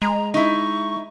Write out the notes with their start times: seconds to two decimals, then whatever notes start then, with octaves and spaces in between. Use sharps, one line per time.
0.02 G#3 A#5
0.34 D#4 E4 C#6